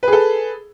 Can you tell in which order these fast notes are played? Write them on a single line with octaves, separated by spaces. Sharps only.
B4 G#4 A4